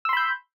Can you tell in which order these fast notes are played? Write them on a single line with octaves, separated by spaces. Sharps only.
E6 C6 B5 G6